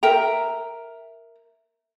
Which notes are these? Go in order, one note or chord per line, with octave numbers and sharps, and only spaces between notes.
A#4 E5 G5 A#5